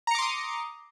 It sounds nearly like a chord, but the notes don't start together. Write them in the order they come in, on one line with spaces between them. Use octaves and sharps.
A#5 C#7 D6 C6 D#6